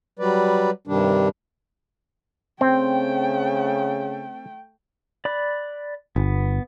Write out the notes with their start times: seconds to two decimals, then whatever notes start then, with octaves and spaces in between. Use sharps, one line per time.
0.19 F#3 G3 B4 D5
0.87 G2 C3 D#3 G3 D4
2.61 C#3 A3 C4 G5
5.25 D5 B5 F#6
6.16 G1 B3